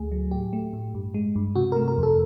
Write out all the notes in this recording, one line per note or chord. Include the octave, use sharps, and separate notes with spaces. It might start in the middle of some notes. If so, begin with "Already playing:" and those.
Already playing: D2 A3 G#4
F#3
A2 G4
A3
A2
G2
G#3
G2
C3 F#4
A#4
A3
A#4
F2 A4